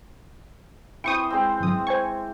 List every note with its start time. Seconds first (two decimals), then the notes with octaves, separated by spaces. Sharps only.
1.04 E3 C4 C5 G5 C#6 D#6
1.30 G#3 C4
1.60 G#1 F#2 D#6
1.87 C5 G#5 C#6